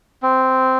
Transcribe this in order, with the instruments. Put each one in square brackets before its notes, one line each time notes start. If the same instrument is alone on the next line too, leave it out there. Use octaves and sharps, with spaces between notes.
[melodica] C4